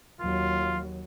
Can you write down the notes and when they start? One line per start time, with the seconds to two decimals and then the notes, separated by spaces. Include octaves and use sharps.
0.21 D#2 F#3 F4